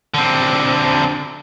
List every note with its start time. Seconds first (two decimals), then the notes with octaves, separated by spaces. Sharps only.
0.14 D3 C4